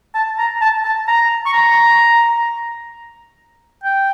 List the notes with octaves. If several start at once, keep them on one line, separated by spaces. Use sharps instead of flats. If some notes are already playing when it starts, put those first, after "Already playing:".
A5
A#5
A5
A5
A#5
C#6
A#5
G5